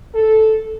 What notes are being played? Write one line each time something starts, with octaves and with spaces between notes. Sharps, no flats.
A4